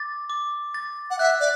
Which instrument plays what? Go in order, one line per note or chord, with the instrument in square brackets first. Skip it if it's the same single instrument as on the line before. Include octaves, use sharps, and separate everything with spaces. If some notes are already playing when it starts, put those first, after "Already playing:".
Already playing: [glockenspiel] D6 A6
D6
A6
[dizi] F#5
[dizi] E5 [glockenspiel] F#6
[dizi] D5